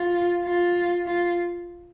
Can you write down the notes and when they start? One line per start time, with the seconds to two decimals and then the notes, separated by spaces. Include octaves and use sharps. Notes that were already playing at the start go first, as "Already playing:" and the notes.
Already playing: F4
0.45 F4
1.06 F4